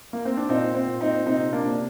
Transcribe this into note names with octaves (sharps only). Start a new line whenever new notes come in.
A#3
C4
D4
A#2 C4 D#4
C4
A#2
C4 D#4
C3 C4 D#4
A#3 D4
C3